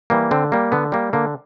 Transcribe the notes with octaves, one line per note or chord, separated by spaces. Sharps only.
E3 G3 A#3
D3 C4
G3 A#3
D3 B3
G3 A#3
D3 A#3